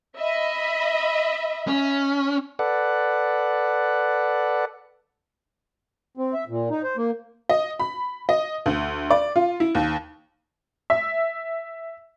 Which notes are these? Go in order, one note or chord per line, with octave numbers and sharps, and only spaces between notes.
D#5 E5 B5
C#4
A4 B4 D5 F#5
C4
E5
A#2
D#4
C5
A#3
D#5
B5
D#5
D2
D5
F4
E4
D#2
E5